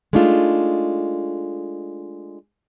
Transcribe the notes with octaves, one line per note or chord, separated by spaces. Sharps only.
G#3 A3 D4 D#4 F4